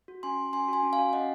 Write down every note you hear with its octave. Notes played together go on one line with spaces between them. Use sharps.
F#4
C#4 G#5 C6
F#4
C#4 G#5 C6
F#4 G#5 C6
C#4
F5 G#5
F#4
C#4 D#5 F#5